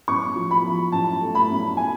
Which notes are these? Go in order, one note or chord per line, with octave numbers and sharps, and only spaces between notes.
F#2 C#6
F3
B5
F3
F#2 A5
A3
B5
F#2
G#5